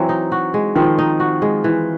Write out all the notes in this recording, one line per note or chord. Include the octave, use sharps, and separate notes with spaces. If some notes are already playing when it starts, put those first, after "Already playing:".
Already playing: E3 F#3 C4
D#4
F#4
G#3
D#3 F3 C4
D#4
F#4
G#3
E3